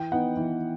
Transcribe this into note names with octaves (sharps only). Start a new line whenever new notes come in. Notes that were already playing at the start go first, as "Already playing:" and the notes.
Already playing: E3 G5
B3 D#4 F#5
E3